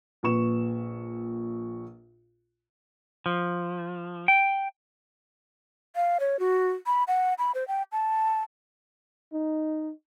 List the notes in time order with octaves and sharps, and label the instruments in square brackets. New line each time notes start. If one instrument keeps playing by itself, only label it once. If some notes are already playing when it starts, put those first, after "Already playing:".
[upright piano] A#1 A#2 B4 C#6 E7
[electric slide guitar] F3
G5
[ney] F5
C#5
F#4
B5
F#5
B5
C5
G5
A5
[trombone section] D#4